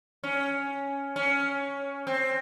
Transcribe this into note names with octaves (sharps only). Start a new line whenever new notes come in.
C#4
C#4
C4